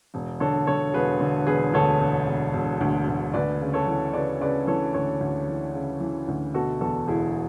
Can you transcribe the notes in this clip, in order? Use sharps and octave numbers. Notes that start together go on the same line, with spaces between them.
E1
D3 A4 C#5
D3 A4 C#5
E1 G#4 B4
D3
E1 G#4 B4
D2 A4 C#5
E1
E1
E1
D2
D2
D2 B4 D5
C#3
A4 C#5
E3
C#3 B4 D5
C#3 B4 D5
E3 A4 C#5
D2 A4 C#5
D2
E3
C#3
E3
D2
B2 F#4 A4
E2 F#4 A4
E1 E4 G#4